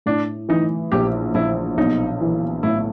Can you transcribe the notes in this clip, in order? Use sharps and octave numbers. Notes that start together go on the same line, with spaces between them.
A2 D4
E3 D#4
A#1 G4
A#1 E4
B1 D#4
E3
A2 E4